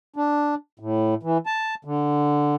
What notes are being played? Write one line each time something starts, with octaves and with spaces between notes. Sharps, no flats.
D4
A2
E3
A5
D3